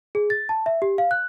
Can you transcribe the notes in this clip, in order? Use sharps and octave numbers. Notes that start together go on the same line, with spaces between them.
G#4
A6
A5
E5
G4
F5
F#6